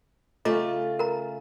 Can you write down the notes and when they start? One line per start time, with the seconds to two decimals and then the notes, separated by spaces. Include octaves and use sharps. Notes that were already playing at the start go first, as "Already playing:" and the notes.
0.45 C#3 A3 F4 D#5 A#5 D6
0.99 A#4 A#5